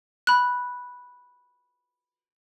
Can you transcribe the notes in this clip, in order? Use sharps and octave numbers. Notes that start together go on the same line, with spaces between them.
B5 F#6